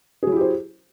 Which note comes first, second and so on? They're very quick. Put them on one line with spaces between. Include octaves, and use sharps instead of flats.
G#4 F#3 E4 G4 C5